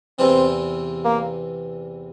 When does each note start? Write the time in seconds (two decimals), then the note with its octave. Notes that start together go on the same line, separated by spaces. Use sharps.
0.19 E2 C3 E3 C4
1.05 A#3